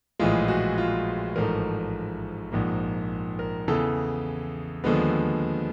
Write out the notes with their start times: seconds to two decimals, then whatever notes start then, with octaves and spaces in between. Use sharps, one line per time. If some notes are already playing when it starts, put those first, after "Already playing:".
0.19 A#1 A2 E3 G#3 F4
0.48 F#4
0.78 F4
1.36 A1 G#2 F3 A3 A#4
2.52 A#1 G#2 F3 A#3
3.39 A#4
3.68 E2 C#3 E3 A4
4.84 D#2 D3 F3 G#3 B3